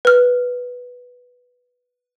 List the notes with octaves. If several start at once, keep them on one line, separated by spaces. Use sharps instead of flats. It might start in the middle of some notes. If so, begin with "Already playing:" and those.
B4 F6